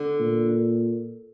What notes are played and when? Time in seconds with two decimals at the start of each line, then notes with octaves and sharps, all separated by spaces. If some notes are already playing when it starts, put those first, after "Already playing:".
Already playing: D3
0.20 A#2